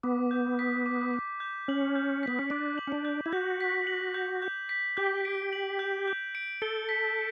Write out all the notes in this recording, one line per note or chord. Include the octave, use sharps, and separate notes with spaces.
B3 D6
G6
B6
D6
D6
G6
C#4 F#7
G6
B3 B6
C#4
D4 D6
F#7
C#4
D4
G6
E4
F#4 G6
B6
F#7
G6
G6
B6
G4 G6
D7
F#7
G6
G6
D7
A4 G7
B6